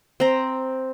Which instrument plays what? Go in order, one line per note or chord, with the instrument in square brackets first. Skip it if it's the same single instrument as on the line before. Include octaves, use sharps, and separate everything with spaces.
[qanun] C4 A#5